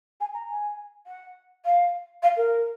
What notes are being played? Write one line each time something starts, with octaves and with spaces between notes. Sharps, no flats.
G#5
A#5
G#5
F#5
F5
F5
A#4